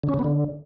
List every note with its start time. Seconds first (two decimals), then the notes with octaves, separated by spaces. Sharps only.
0.03 D3
0.09 C#4
0.14 C#3
0.19 B3
0.24 D3